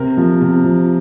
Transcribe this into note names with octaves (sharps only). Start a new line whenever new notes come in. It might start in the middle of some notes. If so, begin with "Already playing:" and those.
Already playing: C3 A#4
F3
C3
F3